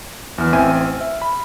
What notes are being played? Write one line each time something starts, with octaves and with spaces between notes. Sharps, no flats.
E2 E3 F6
A1 C4 E5 G#5 D#7
E5
B5